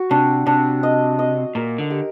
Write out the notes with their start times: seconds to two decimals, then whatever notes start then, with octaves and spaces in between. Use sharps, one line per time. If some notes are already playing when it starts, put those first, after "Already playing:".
Already playing: F#4
0.11 C3 D4
0.46 C3 D4
0.83 D#5
1.19 D#5
1.55 A#2 A#4
1.78 D3
1.90 G4